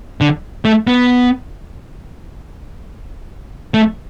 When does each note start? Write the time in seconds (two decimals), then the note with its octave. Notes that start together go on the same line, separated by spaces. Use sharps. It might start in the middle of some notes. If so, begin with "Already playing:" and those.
0.21 D3
0.65 A3
0.87 B3
3.74 A3